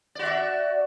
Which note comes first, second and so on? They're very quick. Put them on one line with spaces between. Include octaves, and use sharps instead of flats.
D5 F#4 E5